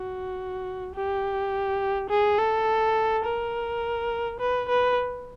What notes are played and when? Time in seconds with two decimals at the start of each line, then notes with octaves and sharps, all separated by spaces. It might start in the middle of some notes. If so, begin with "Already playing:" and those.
Already playing: F#4
0.95 G4
2.10 G#4
2.39 A4
3.25 A#4
4.40 B4
4.69 B4